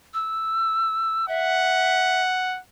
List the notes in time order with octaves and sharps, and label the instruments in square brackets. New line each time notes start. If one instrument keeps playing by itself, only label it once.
[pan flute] E6
[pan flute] E5 [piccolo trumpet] F#5